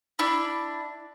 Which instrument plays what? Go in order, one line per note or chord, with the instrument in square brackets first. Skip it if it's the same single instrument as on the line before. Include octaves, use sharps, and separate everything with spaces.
[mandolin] D4 E4 B5